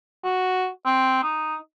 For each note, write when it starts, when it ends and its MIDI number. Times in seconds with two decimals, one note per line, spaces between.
0.24 0.68 66
0.86 1.22 60
1.24 1.56 63